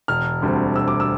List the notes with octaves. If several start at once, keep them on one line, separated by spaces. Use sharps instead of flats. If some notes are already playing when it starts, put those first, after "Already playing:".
E1 F6
D2 D3 G3 C4
E1 E6
D6
E6